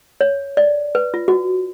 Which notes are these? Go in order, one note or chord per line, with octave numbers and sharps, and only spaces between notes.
C#5
D5
B4
F4
F#4